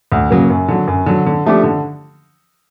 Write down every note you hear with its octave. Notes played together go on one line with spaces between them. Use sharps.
D2
C#3 F#3 A#3
F#2
D3 F#3
F#2
D3 F#3
D3
F3 A3 D4 G4
D3